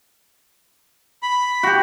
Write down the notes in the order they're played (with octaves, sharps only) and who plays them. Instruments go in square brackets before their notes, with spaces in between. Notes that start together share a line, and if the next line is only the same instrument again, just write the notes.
[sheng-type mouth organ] B5
[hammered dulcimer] F#4 G4